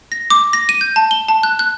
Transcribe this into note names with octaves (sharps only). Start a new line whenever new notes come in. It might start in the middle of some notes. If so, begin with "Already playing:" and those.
A#6
D6
A#6
D#7
G6
A5
G7
A5
F#6
F#6